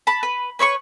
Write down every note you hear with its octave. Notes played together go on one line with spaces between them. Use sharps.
A5 B5
B4
B4 C#5 E5 C#6